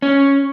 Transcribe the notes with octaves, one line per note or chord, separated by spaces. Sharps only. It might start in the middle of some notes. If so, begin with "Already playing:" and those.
C#4